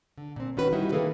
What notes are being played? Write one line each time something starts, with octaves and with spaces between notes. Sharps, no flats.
D3
A#2 C4
D#3 C#4 F#4 B4
G3 D#4 E4 F#4
D#3 F3 A#3 G#4 A4 B4